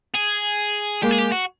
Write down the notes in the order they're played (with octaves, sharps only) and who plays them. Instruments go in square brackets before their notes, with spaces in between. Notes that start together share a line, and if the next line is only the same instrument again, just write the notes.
[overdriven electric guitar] G#4
[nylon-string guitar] G#3 A#3 [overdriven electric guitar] G4
[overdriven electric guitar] G#4
G4
F#4